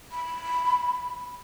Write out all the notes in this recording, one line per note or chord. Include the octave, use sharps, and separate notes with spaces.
B5